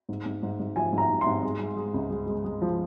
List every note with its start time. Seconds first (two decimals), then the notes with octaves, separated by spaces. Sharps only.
0.09 G#2
0.26 G#2
0.43 G#2
0.60 G#2
0.76 F3 G#5
0.92 G#2
0.98 A#5
1.09 G#2
1.21 C6
1.26 G#2
1.43 G#3
1.61 G#3
1.76 G#3
1.94 C#2
2.10 G#3
2.27 G#3
2.44 G#3
2.62 F3